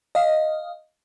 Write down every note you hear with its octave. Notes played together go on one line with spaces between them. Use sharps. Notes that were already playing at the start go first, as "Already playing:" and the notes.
D#5 F5